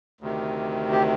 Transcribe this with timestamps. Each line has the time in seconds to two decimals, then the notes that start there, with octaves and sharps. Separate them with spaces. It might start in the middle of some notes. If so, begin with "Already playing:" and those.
0.21 D2 C3 D#3
0.92 G4